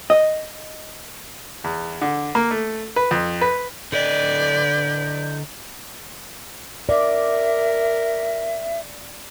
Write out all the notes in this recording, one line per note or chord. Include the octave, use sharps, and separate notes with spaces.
D#5
E2
D3
A#3
A3
B4
F2
B4
D3 A4 B4 D5 D#5 G6
A#4 D5 E5